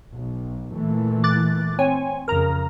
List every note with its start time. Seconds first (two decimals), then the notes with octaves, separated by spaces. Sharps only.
0.14 B1
0.72 A#2 E3 A3
1.24 D6 F#6 A6
1.79 C4 C#5 G#5
2.28 F2 C#3 A#4 A#5